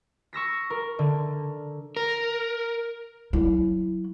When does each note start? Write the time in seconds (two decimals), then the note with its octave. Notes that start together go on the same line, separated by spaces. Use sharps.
0.33 C#6 E6 A#6 B6
0.70 A#4
0.99 D3
1.97 A#4
3.33 F#3 E4